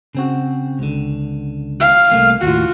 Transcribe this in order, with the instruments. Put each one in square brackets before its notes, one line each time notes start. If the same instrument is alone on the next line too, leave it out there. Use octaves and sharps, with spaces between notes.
[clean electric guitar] C#3 C4 F#4
C#2 D3
[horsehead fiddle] F5
[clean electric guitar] C2 A3 A#3
[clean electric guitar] D#2 A2 [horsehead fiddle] F4 F#4